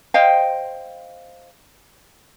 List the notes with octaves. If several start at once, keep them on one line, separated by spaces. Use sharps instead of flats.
C5 D#5 F5 G5